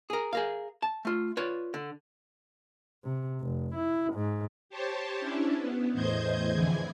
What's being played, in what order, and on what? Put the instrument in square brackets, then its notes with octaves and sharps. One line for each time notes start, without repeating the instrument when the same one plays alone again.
[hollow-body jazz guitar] G#4 A#4
G#4 A#4 F5
A5
A3 F4
F4 B4 C#5 D5
D3
[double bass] C3
F1
E4
G#2
[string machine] G4 C5 C#5 A5
C#4 D4 E4
B3
E2 A2 C5 D#5 G6 G#6
F2 D3 E3 E4 G#4 G#5